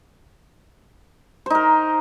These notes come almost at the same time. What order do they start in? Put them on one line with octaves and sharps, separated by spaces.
C5 D#4 A#4